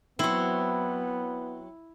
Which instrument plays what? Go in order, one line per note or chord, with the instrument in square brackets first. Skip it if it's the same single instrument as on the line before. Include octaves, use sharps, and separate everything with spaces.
[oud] F#3 C4 [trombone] B3 [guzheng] E4